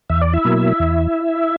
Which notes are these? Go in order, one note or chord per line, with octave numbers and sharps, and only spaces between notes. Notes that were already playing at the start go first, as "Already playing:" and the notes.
E2 E5
D5
E4 E5
B2 F#3 A#3
E2